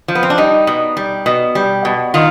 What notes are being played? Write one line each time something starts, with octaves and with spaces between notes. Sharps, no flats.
F3
B3
C4
D4
G3 D#4
B2
G3
B2
G3
B2
D#3 F4